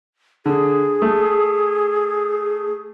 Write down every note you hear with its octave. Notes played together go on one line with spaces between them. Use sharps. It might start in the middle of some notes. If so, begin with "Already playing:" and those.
D3 G#4
A3